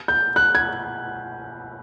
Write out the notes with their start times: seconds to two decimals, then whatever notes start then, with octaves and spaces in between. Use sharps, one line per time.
0.08 G6
0.36 F#6
0.55 G#6